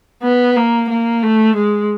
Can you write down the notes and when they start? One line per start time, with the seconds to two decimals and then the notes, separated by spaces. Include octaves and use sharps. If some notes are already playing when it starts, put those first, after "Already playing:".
0.23 B3
0.56 A#3
0.90 A#3
1.23 A3
1.56 G#3